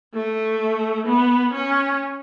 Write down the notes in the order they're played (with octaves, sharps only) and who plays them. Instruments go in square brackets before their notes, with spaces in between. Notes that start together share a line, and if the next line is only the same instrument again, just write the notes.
[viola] A3
B3
C#4